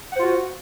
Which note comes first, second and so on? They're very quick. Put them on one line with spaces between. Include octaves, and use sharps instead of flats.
F#5 C5 F4 F#4